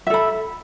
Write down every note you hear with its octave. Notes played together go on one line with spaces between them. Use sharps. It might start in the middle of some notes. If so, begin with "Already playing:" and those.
A4 E5 B5